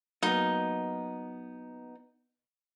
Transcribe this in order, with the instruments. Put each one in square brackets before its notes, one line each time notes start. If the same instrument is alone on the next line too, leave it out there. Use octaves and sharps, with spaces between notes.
[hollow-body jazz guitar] F#3 A#3 B3 [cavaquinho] D#4